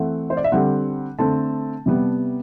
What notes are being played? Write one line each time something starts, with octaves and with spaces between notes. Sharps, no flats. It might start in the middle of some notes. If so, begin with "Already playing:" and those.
Already playing: E3 A3 C4 F#5
C5
D5
E5
D3 G3 C4 F#5
D3 A3 C4 A5
C3 G3 B3